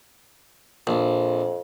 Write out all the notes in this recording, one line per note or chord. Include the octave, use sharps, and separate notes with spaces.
A#1 F2